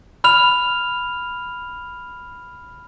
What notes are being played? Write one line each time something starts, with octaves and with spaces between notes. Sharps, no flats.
B5 F6 F7